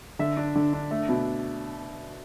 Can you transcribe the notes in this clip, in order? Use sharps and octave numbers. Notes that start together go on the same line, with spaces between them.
D3 E5
D4
D3
D4
A3
B2